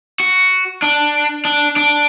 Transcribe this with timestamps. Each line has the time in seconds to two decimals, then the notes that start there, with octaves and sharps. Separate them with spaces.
0.20 F#4
0.82 D4
1.45 D4
1.76 D4